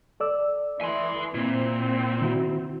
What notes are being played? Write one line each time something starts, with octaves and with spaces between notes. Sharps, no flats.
A4 D5 E6
E3 G#5 C6
A#2 C4 E4
D#3 E4 F#4